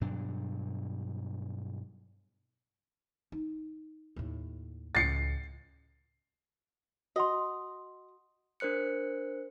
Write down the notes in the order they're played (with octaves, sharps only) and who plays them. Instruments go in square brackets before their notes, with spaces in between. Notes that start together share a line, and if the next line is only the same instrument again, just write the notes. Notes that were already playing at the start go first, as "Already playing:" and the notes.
[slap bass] G2 B2 F#3 D4
[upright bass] D#4
D#2 A2
[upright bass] C#2 A2 [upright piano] A6 C7 C#7
[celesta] F#4 F#5 C6 [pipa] D#5
[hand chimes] D4 A#4 C5 F#6 C#7